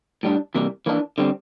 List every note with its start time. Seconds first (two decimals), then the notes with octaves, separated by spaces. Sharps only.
0.23 A2 G3 D4
0.55 C3 E3 G3 A#3
0.86 E3 A#3 D4
1.18 D3 G3 C4